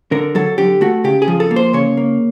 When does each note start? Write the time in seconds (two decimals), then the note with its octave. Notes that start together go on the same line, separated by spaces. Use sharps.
0.12 D3 A#4
0.35 F#3 A4
0.58 D3 G4
0.81 A3 F#4
1.04 C#3 G4
1.22 G#4
1.28 F3
1.40 A4
1.51 A#3
1.56 C5
1.73 C#3 C#5
1.97 A#3